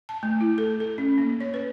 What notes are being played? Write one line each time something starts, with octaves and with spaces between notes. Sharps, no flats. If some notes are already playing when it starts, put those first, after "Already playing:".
A5
A3
E4
A4
A4
C#4
A#3
C#5
B4